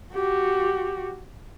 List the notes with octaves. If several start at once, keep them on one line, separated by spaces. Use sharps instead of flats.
F#4 G4